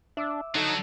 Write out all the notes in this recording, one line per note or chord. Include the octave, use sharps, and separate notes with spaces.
D4 E5 D6 E6
F#3 D4 D#4 A4